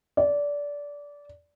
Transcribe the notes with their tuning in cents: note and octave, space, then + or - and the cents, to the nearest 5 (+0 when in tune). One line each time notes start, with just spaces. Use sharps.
D5 -20